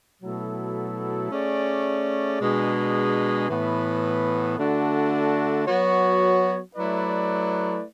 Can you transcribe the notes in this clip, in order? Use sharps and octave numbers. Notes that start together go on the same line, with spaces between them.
B2 F#3 A3 E4 A4
A3 C#4 G#4 D5
B2 G#3 D4 G#4
A2 E3 B3
D3 A3 D4 F#4
F#3 B3 F#4 C#5
F#3 A3 E4 B4 D5